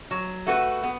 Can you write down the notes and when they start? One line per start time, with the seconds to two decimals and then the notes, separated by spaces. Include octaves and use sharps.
0.11 F#3
0.47 A3 F#4 B4
0.83 B3